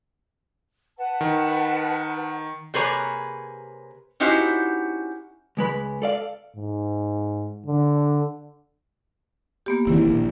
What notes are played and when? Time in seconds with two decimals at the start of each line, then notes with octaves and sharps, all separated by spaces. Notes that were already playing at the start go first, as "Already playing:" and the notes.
0.98 B4 F#5 A5
1.21 D#3
2.74 C3 A#3 G#4 B4 C#5 A#5
4.20 C#4 D#4 E4 F#4 G4 C5
5.57 C#2 G#3 B4 B5
6.02 A4 D5 F5
6.56 G#2
7.66 D3
9.66 A#3 B3 G4
9.87 E1 D#3 C4 E4
10.09 A#1